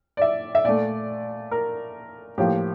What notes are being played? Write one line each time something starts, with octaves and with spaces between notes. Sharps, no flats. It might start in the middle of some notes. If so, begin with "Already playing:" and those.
D5
E5
E5
A#2 A3 D5
A#4
A2 F3 A#3 G4